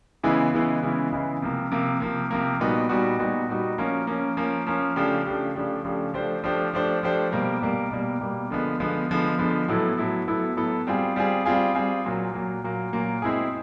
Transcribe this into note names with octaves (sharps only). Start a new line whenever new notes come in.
C#3 E3 G#3 B3 E4
C#3 E3 G#3 B3 E4
C#3 E3 G#3 B3 E4
C#3 E3 G#3 B3 E4
C3 F3 A#3
C3 F3 A#3
C3 F3 A#3
C3 F3 A#3
A#2 G3 B3 D#4 F#4
A#2 G3 B3 D#4 F#4
A#2 G3 B3 D#4 F#4
A#2 G3 B3 D#4 F#4
F3 A#3 C#4
F3 A#3 C#4
F3 A#3 C#4
F3 A#3 C#4
C#3 F3 A3 D4 G4
C#3 F3 A3 D4 G4
C#3 F3 A3 D4 G4
C#3 F3 A3 D4 G4
F3 A3 D4 G4 C5
F3 A3 D4 G4 C5
F3 A3 D4 G4 C5
F3 A3 D4 G4 C5
B2 G3 A#3
B2 G3 A#3
B2 G3 A#3
B2 G3 A#3
D3 F3 G#3 B3
D3 F3 G#3 B3
D3 F3 G#3 B3
D3 F3 G#3 B3
A2 F#3 B3 E4 A4
A2 F#3 B3 E4 A4
A2 F#3 B3 E4 A4
A2 F#3 B3 E4 A4
G3 C4 F4 G#4
G3 C4 F4 G#4
G3 C4 F4 G#4
G3 C4 F4 G#4
A#2 F#3 A#3
A#2 F#3 A#3
A#2 F#3 A#3
A#2 F#3 A#3
G#3 C4 E4 G#4